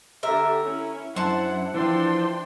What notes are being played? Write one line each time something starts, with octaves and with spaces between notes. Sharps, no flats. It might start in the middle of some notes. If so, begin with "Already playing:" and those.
D3 G4 A#4 E5
C#4 E4
F#2 D4 E4 C5 F#5 A5
E3 F3 D4 G5 C6